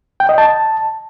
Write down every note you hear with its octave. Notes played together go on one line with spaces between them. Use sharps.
G5
D#5
A5